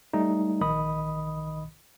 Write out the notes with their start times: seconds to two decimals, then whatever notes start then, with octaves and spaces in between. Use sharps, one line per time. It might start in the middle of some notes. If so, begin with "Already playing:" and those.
0.13 G3 A3 D#4
0.61 A#1 D#3 D#5 B5 D#6